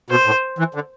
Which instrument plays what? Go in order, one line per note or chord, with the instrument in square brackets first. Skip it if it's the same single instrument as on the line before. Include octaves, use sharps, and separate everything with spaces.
[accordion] B2 [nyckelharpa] C5
[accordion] A2
E3
D3